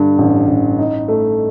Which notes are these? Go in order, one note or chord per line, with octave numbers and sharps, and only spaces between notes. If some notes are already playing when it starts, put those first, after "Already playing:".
Already playing: G2 D3
A1
A1
D#4
A3